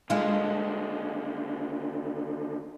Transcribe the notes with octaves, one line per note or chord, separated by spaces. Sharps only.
D#2 D3 G#3 F4